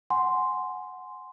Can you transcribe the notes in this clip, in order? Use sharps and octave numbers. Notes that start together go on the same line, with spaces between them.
F#5 G#5 C6